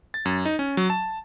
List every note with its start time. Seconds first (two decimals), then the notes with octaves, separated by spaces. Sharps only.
0.14 A6
0.25 F#2
0.45 D#4
0.59 C#4
0.77 F#3
0.90 A5